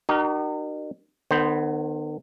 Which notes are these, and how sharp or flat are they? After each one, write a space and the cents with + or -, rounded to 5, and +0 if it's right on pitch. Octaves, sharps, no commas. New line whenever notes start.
D#4 -40 F#4 +40 A#4 +0
D#3 -45 B3 +0 C5 -5